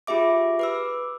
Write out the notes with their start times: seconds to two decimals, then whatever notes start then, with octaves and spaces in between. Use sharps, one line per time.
0.07 F4 G4 G#4 E5 D6
0.59 B4 D6 E6